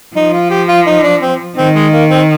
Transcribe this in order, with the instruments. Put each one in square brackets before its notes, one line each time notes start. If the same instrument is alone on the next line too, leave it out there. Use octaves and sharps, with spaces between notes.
[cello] F3 [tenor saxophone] D#4
[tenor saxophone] F4
G4
F4
D#4
D4
C4
[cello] D#3 [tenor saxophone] C4
[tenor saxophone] G#3
A#3
C4